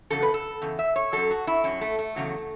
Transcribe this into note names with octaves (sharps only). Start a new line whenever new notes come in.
E2 C#3 F#3 A4
B4
A4
E2 C#3
E5
C#5
F#2 F#3 A4
F#4
E4
F#2 F#3 C#4
A3
A3
E2 C#3 F#3